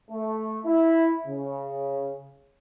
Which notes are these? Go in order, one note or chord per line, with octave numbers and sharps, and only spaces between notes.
A3
E4
C#3